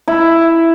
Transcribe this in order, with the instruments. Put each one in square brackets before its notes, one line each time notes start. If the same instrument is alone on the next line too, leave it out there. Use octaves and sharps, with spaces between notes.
[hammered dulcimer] E4